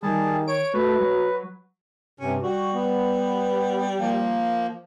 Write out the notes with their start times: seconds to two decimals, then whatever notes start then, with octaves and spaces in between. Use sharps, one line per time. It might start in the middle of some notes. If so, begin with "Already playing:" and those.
0.03 D#3 G3 G#4 A5
0.48 C#5 D7
0.74 A3 F#4 B4
1.00 F#3
2.20 G2 C3 C#4
2.43 G3 F#4
2.73 B3
4.00 F3 A#3